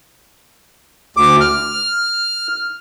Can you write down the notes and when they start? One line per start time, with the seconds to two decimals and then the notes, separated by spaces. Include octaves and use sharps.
1.17 D2 D6
1.41 F6